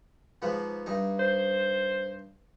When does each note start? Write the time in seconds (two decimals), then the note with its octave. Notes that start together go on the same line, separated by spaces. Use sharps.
0.42 G#2 F3 B3
0.86 G2 D#4
1.19 C5